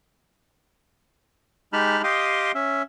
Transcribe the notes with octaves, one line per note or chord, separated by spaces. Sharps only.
G#3 D#4 G4 A5 B5 F6
G4 D#5 F5 G5 C6 D#6
C#4 E5